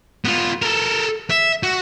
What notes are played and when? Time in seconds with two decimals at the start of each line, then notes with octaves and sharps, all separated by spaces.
0.25 B3 F4
0.62 A4 A#4
1.30 E5
1.63 F#4